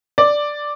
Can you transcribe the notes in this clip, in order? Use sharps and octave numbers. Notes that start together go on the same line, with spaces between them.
D5